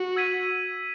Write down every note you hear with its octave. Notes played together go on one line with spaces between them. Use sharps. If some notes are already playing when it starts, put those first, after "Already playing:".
Already playing: F#4
E6 G#6 B6 D#7